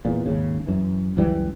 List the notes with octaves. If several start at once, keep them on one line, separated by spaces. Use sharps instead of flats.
E2 A#2
G#1 D#2 C#3
F#2 E3
C#2 F#2 E3 G3